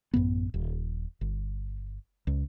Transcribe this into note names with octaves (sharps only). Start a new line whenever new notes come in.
A1 F#2 B2 B3
D#1
G1
C#2